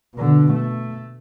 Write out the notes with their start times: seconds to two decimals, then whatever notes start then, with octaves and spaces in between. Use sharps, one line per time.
0.15 B2 D3
0.53 A3